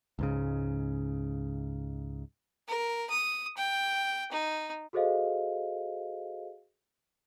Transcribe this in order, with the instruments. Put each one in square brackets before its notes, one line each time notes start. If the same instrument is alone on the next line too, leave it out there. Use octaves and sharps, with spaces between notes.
[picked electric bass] C#2 G#2 C#3
[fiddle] A#4
D#6
G5
D#4
[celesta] F#4 G#4 A4 C5 D#5 F5